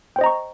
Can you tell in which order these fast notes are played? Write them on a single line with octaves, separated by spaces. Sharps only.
G5 C5 D#5 A#5 C#6